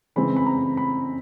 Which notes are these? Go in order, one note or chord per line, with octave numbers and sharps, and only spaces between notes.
C#3 E3 G#3 C4 B5
B5
A#5
B5